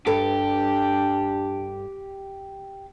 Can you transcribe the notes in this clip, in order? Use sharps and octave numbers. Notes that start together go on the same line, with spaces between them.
G2 D4 G4 A4 B4